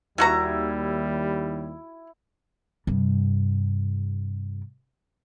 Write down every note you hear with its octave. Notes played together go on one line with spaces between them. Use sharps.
D#2 F#3 G3 E4 F#4 A#5
G2 C3